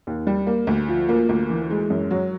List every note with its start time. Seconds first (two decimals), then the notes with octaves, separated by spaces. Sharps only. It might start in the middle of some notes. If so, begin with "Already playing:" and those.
0.07 D#2
0.27 G3
0.47 A#3
0.67 D2
0.88 F3
1.09 A#3
1.29 D2
1.50 E3
1.70 G#3
1.90 F#2
2.11 F#3